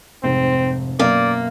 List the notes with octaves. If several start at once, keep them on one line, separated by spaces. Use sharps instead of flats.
F1 G#2 C4
F#2 B2 A#3 D5